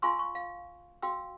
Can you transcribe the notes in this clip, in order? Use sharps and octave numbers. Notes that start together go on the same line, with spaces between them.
F4 F5 G#5 C6 C#6 E6
C#6
F5
F#4 F5 G5 E6